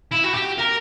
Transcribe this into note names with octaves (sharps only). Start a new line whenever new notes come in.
E4
F#4
G4
A#4